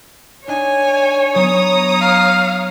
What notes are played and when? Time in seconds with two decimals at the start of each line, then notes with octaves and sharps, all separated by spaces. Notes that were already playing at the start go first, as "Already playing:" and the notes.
0.48 D4 D#4 C#5 G#5
1.35 F#3 B3 A#5 D#6
2.01 F5